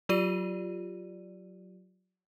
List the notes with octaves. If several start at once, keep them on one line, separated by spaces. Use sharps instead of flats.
F#3 F4 G4 D5 D#7